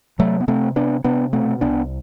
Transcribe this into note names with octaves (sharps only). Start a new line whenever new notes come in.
C3 F#3 A3
B3
C3 A3 C4
C3 B3 D4
C3 B3 D4
B2 A3 C4
C2 B3 D4